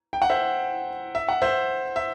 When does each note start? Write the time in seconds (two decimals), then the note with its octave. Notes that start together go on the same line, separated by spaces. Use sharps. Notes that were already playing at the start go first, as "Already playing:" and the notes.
0.13 G5
0.22 F#5
0.30 C5 E5
1.15 E5
1.29 F#5
1.42 C5 E5
1.96 E5